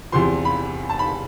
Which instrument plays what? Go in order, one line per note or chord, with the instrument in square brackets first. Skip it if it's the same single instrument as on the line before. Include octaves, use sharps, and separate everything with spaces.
[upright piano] E2 C3 F3 C6
B5
A5
B5